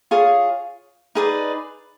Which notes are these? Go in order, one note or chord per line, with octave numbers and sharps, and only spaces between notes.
F4 G#4 C#5
D#4 G#4 B4 D5